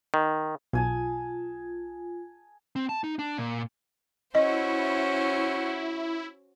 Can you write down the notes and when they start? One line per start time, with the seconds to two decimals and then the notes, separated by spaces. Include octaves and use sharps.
0.14 D#3
0.73 B1 F4 G#4 G#5 A5
2.76 C4
2.89 A5
3.04 D#4
3.19 D4
3.38 A#2
4.35 C#4 E4 F#4 C5 D#5